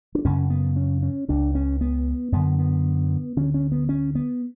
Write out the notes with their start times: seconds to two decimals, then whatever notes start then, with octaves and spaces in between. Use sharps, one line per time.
0.15 D4
0.25 F#2 C#3 C#4
0.50 B3
0.76 C#4
1.03 C#4
1.28 C#2 C#3 D4
1.55 C#4
1.81 B3
2.32 F#2 D3 B3
2.59 B3
3.36 D2 D3 C#4
3.54 C#4
3.72 B3
3.89 C#4
4.15 B3